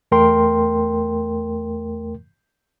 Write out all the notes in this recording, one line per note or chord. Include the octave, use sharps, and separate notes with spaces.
E2 A3 A#4 G5 C6